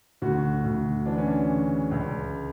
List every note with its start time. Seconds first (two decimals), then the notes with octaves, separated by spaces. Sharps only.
0.22 D2 F#4
0.65 D2
1.06 E3 D4
1.18 C#4
1.28 D4
1.49 C#3
1.91 C#2